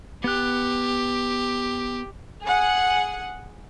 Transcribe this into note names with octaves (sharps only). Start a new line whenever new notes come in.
B3 G4 F#6
G#4 F#5